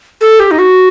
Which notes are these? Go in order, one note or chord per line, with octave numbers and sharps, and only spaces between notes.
A4
G4
D#4
F#4